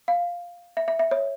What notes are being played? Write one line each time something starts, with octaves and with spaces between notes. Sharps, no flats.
F5
E5
E5
E5
C#5